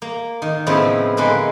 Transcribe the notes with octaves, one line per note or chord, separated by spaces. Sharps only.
A#3
D#3
A2 C#3 F3 B3 C4 E4
D3 G#3 A#3 D4 B4